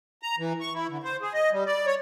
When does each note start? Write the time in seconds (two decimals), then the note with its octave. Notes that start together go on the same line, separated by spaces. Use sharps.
0.22 A#5
0.38 E3
0.61 C#6
0.74 E4
0.89 D3
1.03 C5
1.22 G#4
1.33 D#5
1.52 G3
1.66 D5
1.87 C#5